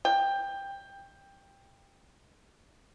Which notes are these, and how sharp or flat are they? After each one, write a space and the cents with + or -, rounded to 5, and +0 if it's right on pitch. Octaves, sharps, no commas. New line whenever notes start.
G5 +15